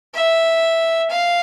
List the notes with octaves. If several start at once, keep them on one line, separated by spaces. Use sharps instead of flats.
E5
F5